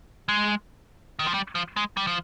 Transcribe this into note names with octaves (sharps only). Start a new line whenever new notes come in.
G#3
D#3
F3
G3
F3
G#3
G3
F3